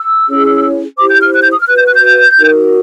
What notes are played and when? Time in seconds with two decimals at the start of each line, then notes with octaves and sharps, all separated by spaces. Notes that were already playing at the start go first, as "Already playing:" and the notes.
Already playing: E6
0.28 C#4 E4 G#4 C#5
0.97 E4 G4 C5 D6
1.08 G6
1.21 F6
1.33 F#6
1.41 G6
1.50 D#6
1.59 F6
1.67 F#4 B4 F#6
1.76 G6
1.85 F#6
1.94 G6
2.38 D#4 F#4 A#4